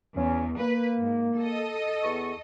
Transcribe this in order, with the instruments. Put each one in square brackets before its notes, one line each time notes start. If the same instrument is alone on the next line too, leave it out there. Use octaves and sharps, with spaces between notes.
[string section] E2 [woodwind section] C#4
[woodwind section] A#3 [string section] B4
[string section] G#2
A4 D#5
[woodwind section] E2 B3 C#6